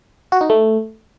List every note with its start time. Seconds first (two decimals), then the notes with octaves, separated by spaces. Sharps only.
0.32 F#4
0.41 D#4
0.50 A3